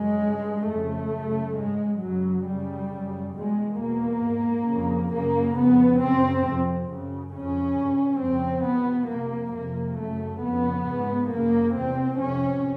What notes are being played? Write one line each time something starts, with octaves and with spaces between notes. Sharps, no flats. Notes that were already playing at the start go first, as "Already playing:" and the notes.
Already playing: F#2 C#3 G#3
G2
F2 C#3 A3
F#2 C#3
G#2 G#3
F#2 C#3 F#3
F#2 C#3 G3
F#2 C#3
E2 B2 G#3
E2 B2 A#3
G#2
F2 C#3
F#2 C#3 A#3
F2 C#3 B3
F#2 C#3 C4
F2 C3
F#2 C#3
F2 C#3 C#4
G2
F2 C#3 C4
E2 B2 B3
F2 C3 A#3
F2 C3 A#3
F#2 C#3 A3
F2 C#3 B3
G#2
F#2 C#3 A#3
E2 C3 C4
F2 C3 C#4